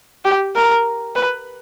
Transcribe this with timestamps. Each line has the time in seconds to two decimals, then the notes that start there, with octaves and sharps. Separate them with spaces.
0.25 G4
0.55 A#4
1.16 B4